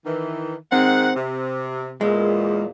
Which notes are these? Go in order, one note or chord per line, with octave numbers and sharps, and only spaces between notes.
D#3 E3
D#3 G#3 C4 F#5
C3
E2 A#2 G#3